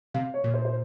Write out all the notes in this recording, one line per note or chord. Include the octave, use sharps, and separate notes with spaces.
C3 F5
C#5
A#2
C5
C5